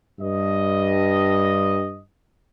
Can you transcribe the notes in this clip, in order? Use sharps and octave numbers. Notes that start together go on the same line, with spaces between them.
G2 D#5